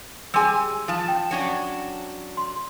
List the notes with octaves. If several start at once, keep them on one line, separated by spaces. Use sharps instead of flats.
G3 G#4 G#5 C6 E6
F3 A5
G5
F#3 C#4 D4
C6